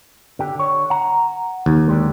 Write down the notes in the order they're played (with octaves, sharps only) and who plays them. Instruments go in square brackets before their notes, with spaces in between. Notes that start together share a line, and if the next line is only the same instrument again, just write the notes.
[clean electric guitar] D3 G4
D3 C#5
F#5 A#5
[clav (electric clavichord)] D#2
[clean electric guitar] D3 G3 G#3